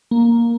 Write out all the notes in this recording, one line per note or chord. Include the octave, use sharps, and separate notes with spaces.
A#3